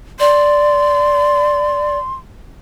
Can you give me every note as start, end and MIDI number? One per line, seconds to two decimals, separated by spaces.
0.20 1.98 74
0.20 2.15 84